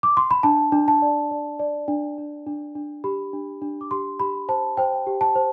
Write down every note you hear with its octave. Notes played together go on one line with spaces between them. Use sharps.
D6
C6
B5
D4 A5
D4
A5
D5
D5
D5
D4
D4
D4
D4
G4 B5
D4
D4
D6
G4 C6
G4 B5
C5 A5
C5 G5
G4
A5
C5